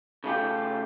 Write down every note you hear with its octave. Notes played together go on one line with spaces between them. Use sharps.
C#3 A3 F4 G4